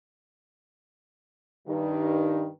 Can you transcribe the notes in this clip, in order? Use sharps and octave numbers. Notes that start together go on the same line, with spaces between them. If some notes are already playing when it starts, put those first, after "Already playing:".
G2 D#3